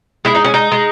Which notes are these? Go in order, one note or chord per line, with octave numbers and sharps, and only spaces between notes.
G#3 E4
D#4
C#4
D#4
G#3